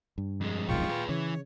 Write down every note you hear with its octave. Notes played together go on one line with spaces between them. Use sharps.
G2
F2 G#3
D#1 B1 D#3 F4 G5 C#6
A#2 G#4 B4
C#3 E3 C#5